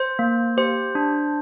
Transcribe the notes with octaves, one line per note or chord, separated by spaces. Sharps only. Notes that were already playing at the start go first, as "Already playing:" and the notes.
Already playing: C5
A#3
G4 C5
D4